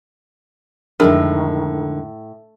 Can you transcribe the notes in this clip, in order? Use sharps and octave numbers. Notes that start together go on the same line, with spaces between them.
F2 A2 D3 D#3 G#3 D4 G#4 A#4